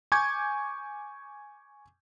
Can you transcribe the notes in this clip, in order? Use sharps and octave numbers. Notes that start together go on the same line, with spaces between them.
G#5 C#6 D6 G6 G#6